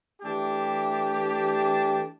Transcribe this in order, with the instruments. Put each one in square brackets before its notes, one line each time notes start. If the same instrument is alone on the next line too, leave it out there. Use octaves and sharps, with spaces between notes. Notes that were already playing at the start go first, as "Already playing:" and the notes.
[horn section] E3 A3 D4 G4